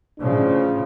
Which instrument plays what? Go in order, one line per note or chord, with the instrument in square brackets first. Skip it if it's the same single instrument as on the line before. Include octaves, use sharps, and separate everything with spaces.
[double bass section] A2 C#3 F3 [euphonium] D4